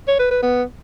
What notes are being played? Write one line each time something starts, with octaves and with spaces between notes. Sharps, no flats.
C#5
B4
B4
B3